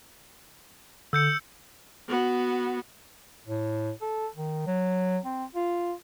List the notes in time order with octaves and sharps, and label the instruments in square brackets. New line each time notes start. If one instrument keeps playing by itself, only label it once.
[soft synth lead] D3 [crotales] E6 G6 C#7
[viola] B3 F#4
[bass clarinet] A2
A4
D#3
F#3
C4
F4